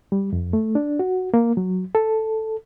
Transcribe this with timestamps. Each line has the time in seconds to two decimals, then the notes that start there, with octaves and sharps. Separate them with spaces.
0.12 G3
0.33 F2
0.53 A3
0.75 D4
0.99 F#4
1.34 A#3
1.57 F#3
1.95 A4